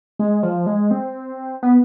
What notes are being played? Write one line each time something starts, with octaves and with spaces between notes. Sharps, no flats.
G#3
F3
G#3
C4
B3